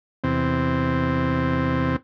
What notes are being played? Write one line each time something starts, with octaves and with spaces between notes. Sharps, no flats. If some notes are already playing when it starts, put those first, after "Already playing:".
E2 C3 C4